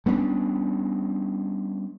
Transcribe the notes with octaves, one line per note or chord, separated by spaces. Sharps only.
G3 B3 C#4 D4